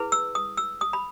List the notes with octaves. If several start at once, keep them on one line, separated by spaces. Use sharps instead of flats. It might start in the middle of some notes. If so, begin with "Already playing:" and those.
Already playing: E4 G#4 B4
E6
D#6
E6
D#6
B5